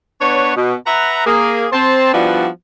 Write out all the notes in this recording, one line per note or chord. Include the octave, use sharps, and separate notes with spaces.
B3 D4 B4 C#5
B2
B4 E5 F#5 A#5
A#3 G#4
C4 C5 A5
F3 G3 B3 D4 E4 F#4